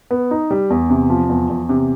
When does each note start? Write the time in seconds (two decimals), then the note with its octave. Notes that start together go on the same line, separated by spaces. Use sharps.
0.11 B3
0.31 D#4
0.51 G3
0.70 E2
0.90 C3
1.10 F3
1.29 E2
1.49 E2
1.69 C3